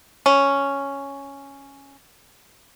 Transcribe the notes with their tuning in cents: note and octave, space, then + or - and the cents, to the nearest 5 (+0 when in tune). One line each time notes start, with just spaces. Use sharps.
C#4 +0